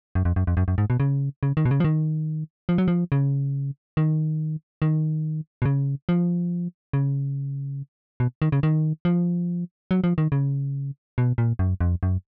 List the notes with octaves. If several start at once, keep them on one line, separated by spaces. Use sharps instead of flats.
F#2
F2
F#2
F2
F#2
F#2
G#2
B2
C#3
C#3
D#3
B2
C#3
F3
D#3
F3
F#3
F3
C#3
D#3
D#3
B2
C#3
F3
C#3
B2
D#3
C#3
D#3
F3
F#3
F3
D#3
C#3
B2
A#2
F#2
F2
F#2